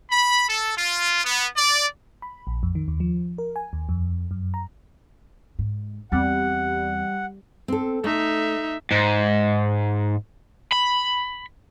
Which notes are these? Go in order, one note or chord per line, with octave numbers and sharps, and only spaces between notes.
B5
A4
F4
B3
D5
B5
A#1
F2
D#3
D#2
F3
A#4
G#5
D#2
F2
F#2
A#5
G#2
E2 G3 C4 F#5
C4 A4
A3 D#4 E5
G#2
B5